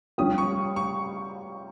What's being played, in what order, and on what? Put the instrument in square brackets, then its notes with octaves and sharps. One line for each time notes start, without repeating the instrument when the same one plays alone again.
[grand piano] G3 C#4 G4 [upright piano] D#6
[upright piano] C#6
C#6